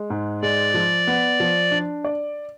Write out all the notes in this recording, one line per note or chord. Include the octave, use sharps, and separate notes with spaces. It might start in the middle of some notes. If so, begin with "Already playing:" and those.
Already playing: G#3
G#2
G#3 D5
F3
B3
F3
D4
D5